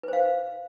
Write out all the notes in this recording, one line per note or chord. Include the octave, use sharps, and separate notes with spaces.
B4 C5 F5